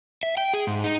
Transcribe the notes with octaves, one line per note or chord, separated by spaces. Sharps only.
E5
G5
G#4
G#2
D#4